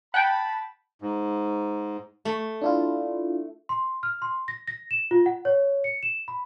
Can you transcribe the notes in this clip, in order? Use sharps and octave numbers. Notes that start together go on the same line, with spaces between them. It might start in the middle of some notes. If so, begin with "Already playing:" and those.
F#5 G5 A5 B5
G#2
A3
D4 E4 F4
C6
F6
C6
A#6
A#6
E7
F4
F#5
C#5
C#7
E7
B5